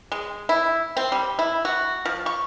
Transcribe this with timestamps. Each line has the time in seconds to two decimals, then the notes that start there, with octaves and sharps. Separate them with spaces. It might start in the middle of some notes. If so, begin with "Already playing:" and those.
0.12 G#3
0.49 E4
0.97 C4
1.12 G3
1.39 E4
1.65 F#4
2.05 F3
2.26 C#6